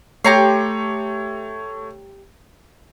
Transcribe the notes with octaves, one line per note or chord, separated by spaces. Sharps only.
A3 G4 C#5 A#5 C6 C#7